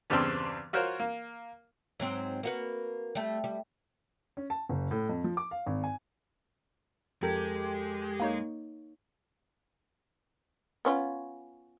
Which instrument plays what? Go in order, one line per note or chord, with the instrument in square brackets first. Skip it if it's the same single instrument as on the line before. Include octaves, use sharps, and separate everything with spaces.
[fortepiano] E2 G2 C#3 C4 D4 C6
F4 F#4 A#4 C5 C#5
A#3
[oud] G#2 F#3 C4
A#3 F#4 B4
G3 A3
G3
[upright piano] C#4
A5
F#1
A2
F2
F3
D6
F5
G#1
G#5
[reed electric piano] F2 A4 A#4 [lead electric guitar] G#3 [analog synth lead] G4
[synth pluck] A#3 D#4 C#5
[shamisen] B3 C#4 F4